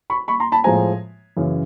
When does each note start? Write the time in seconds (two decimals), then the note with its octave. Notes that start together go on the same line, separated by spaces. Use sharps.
0.10 B5 C#6
0.28 B5 C#6
0.40 A#5 C6
0.52 A5 B5
0.64 A2 F3 G#3 C4 G#5 A#5
1.37 F#2 C#3 E3